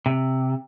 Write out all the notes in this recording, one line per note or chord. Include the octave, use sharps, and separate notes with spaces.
C3